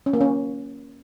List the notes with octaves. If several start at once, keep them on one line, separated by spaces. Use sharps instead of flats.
C#4
A#3
C#4